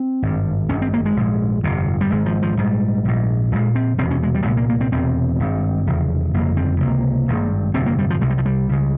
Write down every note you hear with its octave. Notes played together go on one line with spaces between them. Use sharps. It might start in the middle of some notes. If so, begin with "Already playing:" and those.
Already playing: C4
G#1 G2
G#1 G2 C#4
C4
A#3
G#3
A#1 G#2
G1 F2 C3
G3
G#1 G#2 G#3
F3
F3
A#1 G#2 G3
A#1 G#2
A#1 A#2 G#3
C4
E1 E2 C3 C4
C#4
G#3
G3
C2 A#2 G#3
A#3
A#3
C4
E1 E2 C3 C4
G#1 G2
F1 E2 C#3
G1 F2 C#3 A#3
C4
C#2 C3 A#3
G#1 G2
G1 F2 C3 C4
A#3
G3
F3
C2 C3 G#3
G3
F3
G3
C#2 C#3